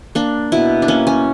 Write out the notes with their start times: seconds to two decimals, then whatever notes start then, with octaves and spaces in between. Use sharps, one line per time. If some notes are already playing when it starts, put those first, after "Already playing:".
0.15 A#3 D4
0.52 B2 E4
0.82 D4
0.88 A#3 C#4
1.07 C#4